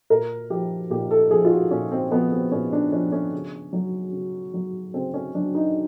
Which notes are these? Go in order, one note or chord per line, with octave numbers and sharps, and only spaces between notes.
A#2 A#4
F3 G4
A#2 G4
A4
F3 G#4
F4
F#4
A#2 C#4
C4
F3 B3
C4
A#2 C#4
D4
F3 C#4
C#4
C#3
F#3
C#3
F#3
C#3 C4
C#4
F#3 D4
D#4